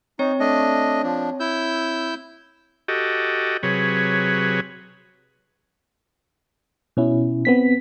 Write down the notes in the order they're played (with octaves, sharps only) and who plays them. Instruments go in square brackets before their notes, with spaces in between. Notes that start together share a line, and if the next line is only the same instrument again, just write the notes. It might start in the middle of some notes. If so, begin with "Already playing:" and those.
[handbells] C4 C#5 [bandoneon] D#4
[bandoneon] A3 D4 D#5
F3 D4
E4 E6 G6
[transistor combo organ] F#4 G4 A4 D#5
C3 F#3 G#4 B4 C#5
[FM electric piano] B2 C#4 E4
B3 C4 B6